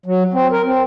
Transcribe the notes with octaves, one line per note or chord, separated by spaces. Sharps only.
F#3
C4
A#4
C4